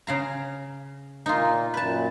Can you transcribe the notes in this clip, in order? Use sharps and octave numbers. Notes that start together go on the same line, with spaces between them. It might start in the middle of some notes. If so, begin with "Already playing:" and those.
C#3 F5 A#5
A#2 A#3 D#4 F4
F#2 A#2 B4 A5